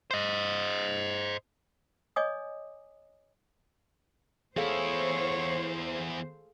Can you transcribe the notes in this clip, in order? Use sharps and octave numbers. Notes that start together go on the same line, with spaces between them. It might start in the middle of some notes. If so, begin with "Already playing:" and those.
C5 D#5
C#5 D#5 G#5 D6 D#6
E2 E4 G#4 A4 C5 C#5 F5